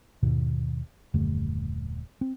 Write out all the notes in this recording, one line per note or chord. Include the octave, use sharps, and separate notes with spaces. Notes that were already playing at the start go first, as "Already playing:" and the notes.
D#2 G#2 B2 D#3
D#1 F#2 D3 A3
C4